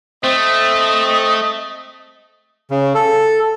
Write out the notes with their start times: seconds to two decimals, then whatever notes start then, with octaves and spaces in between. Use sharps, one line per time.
0.24 A3 C4 D#5
2.71 C#3
2.95 A4